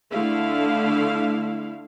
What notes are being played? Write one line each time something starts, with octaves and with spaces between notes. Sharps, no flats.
D3 A3 E4 F5